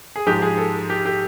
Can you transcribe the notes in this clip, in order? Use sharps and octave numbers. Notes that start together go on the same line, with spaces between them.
G#4
G#2 F3 G#3 G4
G#4
A4
G4
G4